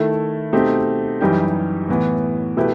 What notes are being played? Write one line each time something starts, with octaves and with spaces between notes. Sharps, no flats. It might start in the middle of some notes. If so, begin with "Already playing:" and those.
Already playing: D#3 A3 E4 A4
B2 A3 C4 D#4 G4
F#2 E3 G3 D#4 G4
A2 E3 B3
B2 A3 E4 G4 B4